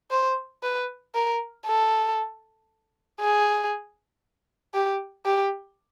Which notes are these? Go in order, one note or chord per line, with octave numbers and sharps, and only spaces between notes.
C5
B4
A#4
A4
G#4
G4
G4